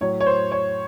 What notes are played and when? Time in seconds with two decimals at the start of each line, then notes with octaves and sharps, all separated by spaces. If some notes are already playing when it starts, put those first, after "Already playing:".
0.01 A2 F#3 C#5
0.20 C#5
0.26 C5
0.52 C#5